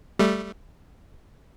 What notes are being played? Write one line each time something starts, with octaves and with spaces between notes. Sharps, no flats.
G3 A3